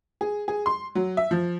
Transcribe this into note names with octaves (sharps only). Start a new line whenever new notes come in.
G#4
G#4
C6
F#3
E5
F3